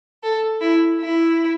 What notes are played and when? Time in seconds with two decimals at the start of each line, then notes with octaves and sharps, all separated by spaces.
0.23 A4
0.61 E4
1.01 E4